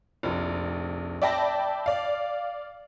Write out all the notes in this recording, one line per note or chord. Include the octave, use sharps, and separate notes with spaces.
F1 A#1
D5 E5 G5 A5 B5 A#6
D5 F5